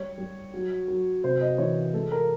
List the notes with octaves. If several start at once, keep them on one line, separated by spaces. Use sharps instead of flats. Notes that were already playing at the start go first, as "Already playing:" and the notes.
Already playing: G3 C#5
G3
F#3
F#3
C3 C5
D#5
E3 C#5
G#3 A4
A#4